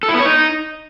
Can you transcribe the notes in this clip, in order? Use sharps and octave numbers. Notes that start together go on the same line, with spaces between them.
A4
E4
B3
C#5
D#4